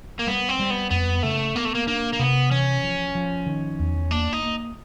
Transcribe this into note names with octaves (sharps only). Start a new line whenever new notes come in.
A#3
G3 B3
C4
G3
B3
F2 B3
C#3 A3
A#3 B3
A3
A#3
A#3 D4
A#3
C3 B3
E3 C#4
F3
F3
D#3
E2
A#3 D4
D#4
A#3